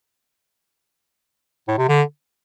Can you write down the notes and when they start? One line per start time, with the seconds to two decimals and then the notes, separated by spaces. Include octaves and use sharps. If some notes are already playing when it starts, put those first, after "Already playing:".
1.68 A2
1.78 C3
1.89 D3